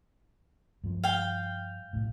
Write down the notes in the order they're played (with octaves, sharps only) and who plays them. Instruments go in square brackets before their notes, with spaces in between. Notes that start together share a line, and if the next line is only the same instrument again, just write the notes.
[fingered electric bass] G2 F3
[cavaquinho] F5 G5
[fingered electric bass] B1 A2